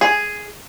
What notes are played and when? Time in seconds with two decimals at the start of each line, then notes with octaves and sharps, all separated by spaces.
0.01 G#4